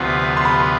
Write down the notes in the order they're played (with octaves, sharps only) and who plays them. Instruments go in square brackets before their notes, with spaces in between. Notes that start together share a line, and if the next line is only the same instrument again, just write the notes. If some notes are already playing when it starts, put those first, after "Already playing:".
Already playing: [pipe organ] D2 C3 F3 B3 F4 [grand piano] C6
[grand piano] C6
B5
C6